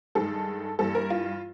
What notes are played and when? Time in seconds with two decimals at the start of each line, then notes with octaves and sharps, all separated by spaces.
0.15 G2 D#3 G#3 A4
0.79 G2 E3 G3 A#3 A4
0.95 A#4
1.10 F4